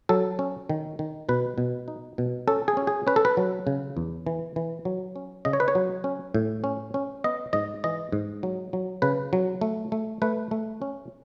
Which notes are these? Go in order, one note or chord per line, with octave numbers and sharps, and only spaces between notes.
F#3 A4
C#4
D#3
D#3
B2 B4
B2
D#4
B2
C#4 A4
G#4
C#4
G#4
C#4 B4
A4
B4
F#3
C#3
E2
E3
E3
F#3
C#4
C#3 D#5
C#5
B4
C#5
F#3
C#4
A2
C#4
C#4
B3 D#5
G#2 D#5
E3 D#5
G#2
F#3
F#3
C#3 B4
F#3
A3
A3
A3 B4
A3
C#4